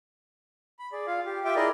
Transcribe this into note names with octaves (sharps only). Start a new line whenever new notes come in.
B5
G#4 D5
F4 F5
G4
F4 G4 E5 G5 D6
E4 G#4 A#4 D5 D#5